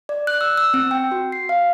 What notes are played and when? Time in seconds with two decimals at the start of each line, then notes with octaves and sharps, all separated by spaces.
0.09 D5
0.27 F#6
0.41 E6
0.57 E6
0.74 C4
0.91 G5
1.12 F#4
1.32 C7
1.49 F5